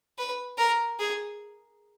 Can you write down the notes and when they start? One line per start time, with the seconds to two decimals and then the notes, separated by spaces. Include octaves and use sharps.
0.18 B4
0.58 A#4
0.99 G#4